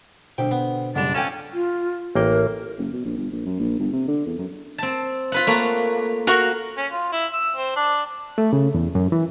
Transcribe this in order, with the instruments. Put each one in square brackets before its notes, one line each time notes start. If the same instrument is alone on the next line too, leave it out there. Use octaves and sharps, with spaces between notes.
[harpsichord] C2 G4 G5 [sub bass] B2 [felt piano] D3 C5
[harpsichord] B3
[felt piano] F#1 G3 E7 [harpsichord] D3 [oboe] D4
[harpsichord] F2 A4 D6 [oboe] C#4 [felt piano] G5 G#5 E7
[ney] F4
[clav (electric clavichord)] A1 A#3 G5 [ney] A#4
[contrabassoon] F#1
B2
A#1
G1
A#1
F#2
A#1
G1
C3
D3
E2
F#2
[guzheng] C4 A5
F4 B4 F#5
[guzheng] A3 A#3 [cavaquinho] C#5
[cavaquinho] F#4 A#4 C#6 [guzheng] F5
[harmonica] C#4
F4
E4
E6
C4
D4
[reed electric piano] A3
C#3
E2
F#2
E3